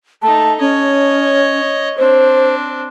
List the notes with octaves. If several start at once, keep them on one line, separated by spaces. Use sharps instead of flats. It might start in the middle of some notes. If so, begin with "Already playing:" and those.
A3 D#4 A5
C#4 C#5 D#5
C4 D4 C5